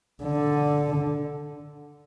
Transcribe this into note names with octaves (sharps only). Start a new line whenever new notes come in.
D3